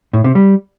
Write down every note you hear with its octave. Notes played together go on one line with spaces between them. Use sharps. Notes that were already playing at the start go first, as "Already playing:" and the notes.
A2
C3
G3